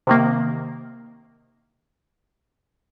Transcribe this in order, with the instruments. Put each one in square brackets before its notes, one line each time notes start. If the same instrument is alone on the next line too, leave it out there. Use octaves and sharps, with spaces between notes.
[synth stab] C3 D#3 A#3